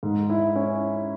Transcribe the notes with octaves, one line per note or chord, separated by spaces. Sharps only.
G#2
E4
C#4